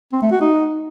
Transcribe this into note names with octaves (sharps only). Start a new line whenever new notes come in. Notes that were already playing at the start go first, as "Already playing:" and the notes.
C4
A3
F#4
D#4